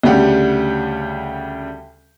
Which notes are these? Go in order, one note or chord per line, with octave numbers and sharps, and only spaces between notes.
D2 C#3 G3 G4 F#5